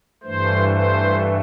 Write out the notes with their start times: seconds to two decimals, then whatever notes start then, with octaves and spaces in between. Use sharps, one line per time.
0.23 G2 E3 A3 C5
0.68 C5